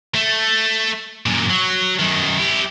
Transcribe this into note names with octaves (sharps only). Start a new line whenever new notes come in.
A3
F#2 A#2
F#3
F#2 D#3
E4 G4